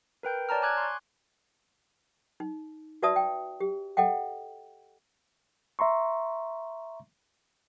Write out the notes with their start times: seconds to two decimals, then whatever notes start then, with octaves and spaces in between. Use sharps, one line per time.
0.23 A#4 B4 G5 G6
0.49 C#5 D5 A5 A#5 F6
0.62 G#5 D6 F#6 G#6
0.77 C6 C#6
2.40 D#4
3.02 F#4 B4 D5 E5 A5 D#6
3.16 G5
3.60 G4
3.97 A4 D#5 F#5 G5
5.79 E5 A#5 C6 C#6